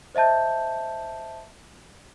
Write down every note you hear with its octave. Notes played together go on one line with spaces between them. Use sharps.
C5 D#5 E5 A5 G6